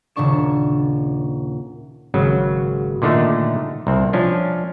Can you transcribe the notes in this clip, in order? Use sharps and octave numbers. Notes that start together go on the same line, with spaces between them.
D#1 A#2 C#3 D4 C#6 E7
G#1 C#3 F#3
A#2 D3 D#3 A3
C2 C4
F3 C#4 D4